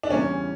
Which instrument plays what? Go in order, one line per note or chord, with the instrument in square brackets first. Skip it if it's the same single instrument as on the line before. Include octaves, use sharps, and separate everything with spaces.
[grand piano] D4
[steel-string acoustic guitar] E2 C#3 E3 G3 A#3 [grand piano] C#4